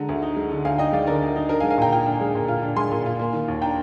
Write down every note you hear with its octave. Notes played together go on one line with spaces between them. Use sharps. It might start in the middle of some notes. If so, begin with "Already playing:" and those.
Already playing: D3 G#3 A#5
D2
D#4
G#3
D3
D2 F5 G#5
D#4 D#5 G5
G#3 D5 F5
D3 A#4 D5
D2
D#4
D4 A#4
F5 G#5
G#3
F5 G#5
A#2 G5 A#5
F4 G5 A#5
D4
G#3
A#2
F4
D4
G#3 G#5 C6
A#2
F4
A#3
D#3
D#2
D4 G5 A#5